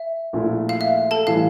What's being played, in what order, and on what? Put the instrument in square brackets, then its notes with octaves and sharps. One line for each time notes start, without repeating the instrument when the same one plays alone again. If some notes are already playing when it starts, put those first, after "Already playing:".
Already playing: [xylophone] E5
[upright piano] A#1 A#2 A3 E4
[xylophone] F5
E5
A4 A5
[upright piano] A2 E3 G3 [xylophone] F5